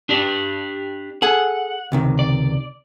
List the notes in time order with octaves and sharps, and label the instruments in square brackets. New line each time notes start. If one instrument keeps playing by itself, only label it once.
[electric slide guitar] D4 G4 D5
[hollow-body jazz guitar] G#4 A4 G#5 [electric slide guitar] F#5
[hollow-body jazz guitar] C#2 C3 D#3
[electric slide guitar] D5